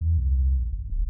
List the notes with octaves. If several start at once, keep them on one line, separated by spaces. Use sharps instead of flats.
E2
C2
A#1
G1
D1